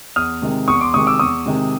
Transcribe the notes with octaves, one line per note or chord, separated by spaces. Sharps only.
E2 D#6 F6
C3 D#3 G#3
E2 C#6 D#6
C6 D6
C3 D#3 G#3 C#6 D#6
D6 E6
E2 C#6 D#6
C3 D#3 G#3